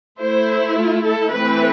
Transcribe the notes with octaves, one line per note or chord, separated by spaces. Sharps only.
A3 E4 C5
F4
A4
E3 A3 C4 E4 B4